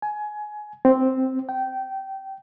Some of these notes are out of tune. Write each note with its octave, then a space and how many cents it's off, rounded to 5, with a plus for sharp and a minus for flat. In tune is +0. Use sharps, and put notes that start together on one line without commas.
G#5 +20
C4 +0
G5 -20